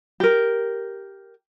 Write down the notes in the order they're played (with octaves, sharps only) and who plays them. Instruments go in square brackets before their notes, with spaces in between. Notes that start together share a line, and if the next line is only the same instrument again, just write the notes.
[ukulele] G4 A#4